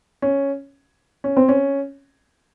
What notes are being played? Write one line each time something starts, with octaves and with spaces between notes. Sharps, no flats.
C#4
C#4
C4
C#4